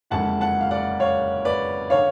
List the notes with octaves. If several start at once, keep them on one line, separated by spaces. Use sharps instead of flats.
F#1 F2 D3 G#3 F#5 A5
F#5 A5
F5
D5 F#5
C#5 F5
B4 D5
D3 C#5 F5